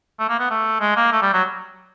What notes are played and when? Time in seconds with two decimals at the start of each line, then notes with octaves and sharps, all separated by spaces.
0.19 A3
0.29 A#3
0.40 B3
0.50 A3
0.81 G#3
0.96 A#3
1.12 A3
1.22 G3
1.33 F#3